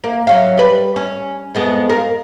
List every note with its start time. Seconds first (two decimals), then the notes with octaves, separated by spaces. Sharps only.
0.04 A#3
0.27 F#3 C#4 F5
0.57 G3 B4
0.96 C#4
1.55 F2 G#3 B3
1.89 A#4 F5